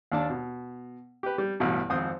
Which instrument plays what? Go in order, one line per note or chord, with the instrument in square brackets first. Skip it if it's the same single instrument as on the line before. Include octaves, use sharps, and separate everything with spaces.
[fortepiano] D#2 D4 A5
B2
G4 B4
G3
A1 G2 B2
G#1 F2 C4 C5 D#6